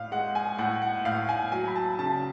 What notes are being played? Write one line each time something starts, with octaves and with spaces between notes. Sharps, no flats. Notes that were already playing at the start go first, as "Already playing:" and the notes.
Already playing: A2 F5
G#3 F#5
G#5
A2 F#5
F#5
A2 F5
G#5
F#3 G#5
B5
A5
C#3 A5